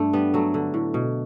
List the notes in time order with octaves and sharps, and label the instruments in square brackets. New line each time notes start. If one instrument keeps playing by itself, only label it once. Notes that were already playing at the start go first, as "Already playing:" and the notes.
Already playing: [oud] G2 [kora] A3 D4
[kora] G3 B3
F#3 A3
D3
A2
B2